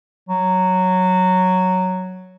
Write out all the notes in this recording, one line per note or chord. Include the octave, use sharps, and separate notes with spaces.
F#3